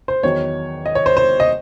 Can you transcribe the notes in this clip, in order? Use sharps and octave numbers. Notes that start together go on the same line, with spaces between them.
C5
E2 D#3 F#3 C#5
D#5
C#5
C5
C5
D#5